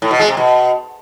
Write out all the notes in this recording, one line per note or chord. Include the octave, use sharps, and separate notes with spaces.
A2
B2
G#3
C3
B2